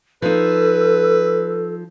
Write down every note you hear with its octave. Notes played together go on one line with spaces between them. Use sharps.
F3 D#4 A4 B4